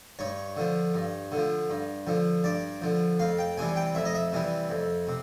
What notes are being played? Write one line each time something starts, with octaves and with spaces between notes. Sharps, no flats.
G2 C#5
D3 F3
G2
D3 F3
G2
D3 F3
G2 D5
D3 F3
F2 F5
G5
C3 E3 G3 G#5
G5
F2 E5
D#5
E5
C3 E3 G3
F2
C3